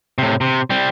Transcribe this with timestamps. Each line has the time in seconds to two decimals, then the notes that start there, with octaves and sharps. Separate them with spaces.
0.18 A2 C3
0.41 C3
0.70 G3 C4